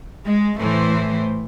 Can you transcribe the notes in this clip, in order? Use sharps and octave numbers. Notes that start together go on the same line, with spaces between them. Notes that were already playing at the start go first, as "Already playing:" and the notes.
G#3
A2 E3 A3 C5